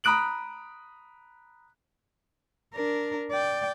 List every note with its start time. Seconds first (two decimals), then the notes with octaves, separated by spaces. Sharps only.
0.04 A#5 B5 D#6 F#6 D7 F#7
2.74 D4 A#4
3.31 D5 G5